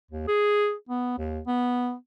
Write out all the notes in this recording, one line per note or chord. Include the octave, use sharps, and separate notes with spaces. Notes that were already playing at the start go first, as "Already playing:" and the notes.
D#2
G#4
B3
D#2
B3